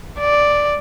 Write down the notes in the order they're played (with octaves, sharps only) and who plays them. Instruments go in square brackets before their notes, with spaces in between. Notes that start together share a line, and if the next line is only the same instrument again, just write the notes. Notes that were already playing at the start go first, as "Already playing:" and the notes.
[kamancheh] D5